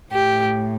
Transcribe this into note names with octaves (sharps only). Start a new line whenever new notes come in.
A2 G4